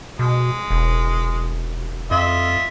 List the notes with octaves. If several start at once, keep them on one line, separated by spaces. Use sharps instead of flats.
B2 G#3
E1
F2 F4 D#5 E5